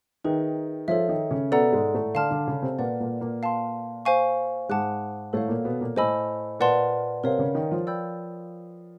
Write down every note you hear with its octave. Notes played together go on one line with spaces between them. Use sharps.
D#3 D#4 G#4 B4 E5 G5
F3 F4 A4 C#5 E5
D#3 D#4
C#3 C#4
B2 B3 A4 D5 F#5 A#5
G#2 G#3
A2 A3
D3 D4 F5 A5 C6 F6
D3 D4
C#3 C#4
C3 C4
A#2 A#3 B4 D5 F#5
A#2 A#3
A#2 A#3
F5 A5 C6
C5 F5 G#5 C#6
G#2 G#3 F#5 A5 D6 F#6
A2 A3 A4 C#5 F5
A#2 A#3
B2 B3
A#2 A#3
A2 A3 C5 D#5 G#5 B5 E6
A#2 A#3 B4 D5 F#5 A5 C6
C3 C4 A#4 C#5 F5
C#3 C#4
D#3 D#4
F3 F4
D5 G5 B5 E6 G6